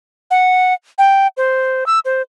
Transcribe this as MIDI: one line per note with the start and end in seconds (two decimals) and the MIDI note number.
0.31 0.73 78
0.98 1.27 79
1.37 1.84 72
1.86 1.99 88
2.05 2.22 72